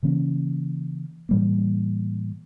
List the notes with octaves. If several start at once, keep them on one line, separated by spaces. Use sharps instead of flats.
C#3 E3 A#3 C#4
A2 E3 G3 A#3